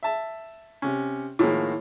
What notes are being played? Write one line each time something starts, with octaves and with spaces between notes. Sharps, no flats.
E5 A5
C3 C#4
A2 D#3 F3 G#3 A#3